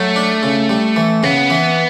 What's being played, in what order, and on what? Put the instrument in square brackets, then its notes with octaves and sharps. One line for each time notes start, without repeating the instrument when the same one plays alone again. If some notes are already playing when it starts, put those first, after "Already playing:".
Already playing: [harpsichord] F#3 [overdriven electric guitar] A3
[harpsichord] D4
C#3
G3
E3
[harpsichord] C#3 [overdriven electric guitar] B3
[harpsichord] E3